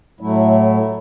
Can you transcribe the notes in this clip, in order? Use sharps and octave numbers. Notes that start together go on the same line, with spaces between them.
A2 F#3 A3 E4